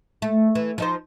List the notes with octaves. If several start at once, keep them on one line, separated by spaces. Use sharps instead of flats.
A3
E3
F3 D#4 C5